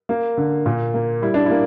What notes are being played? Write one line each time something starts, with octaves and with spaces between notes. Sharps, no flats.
A#3
D3
A#2
A#3
G3 E4
D4
A#3 E4